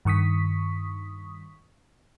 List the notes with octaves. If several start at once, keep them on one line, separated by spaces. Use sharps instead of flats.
G2 D#3 C#6 D#6 B6